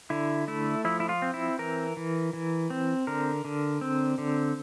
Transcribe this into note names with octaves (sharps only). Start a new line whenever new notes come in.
D3 E4
A3 E4
F3 E4
E4
F4
C4
E4
E3 A#4
E3
E3
C4
D3 A#4
D3
C4
D3